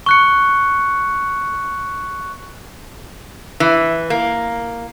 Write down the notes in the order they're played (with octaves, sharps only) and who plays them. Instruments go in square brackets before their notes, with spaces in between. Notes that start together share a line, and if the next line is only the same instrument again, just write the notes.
[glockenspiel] C#6 F#6 C#7
[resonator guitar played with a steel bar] E3
A#3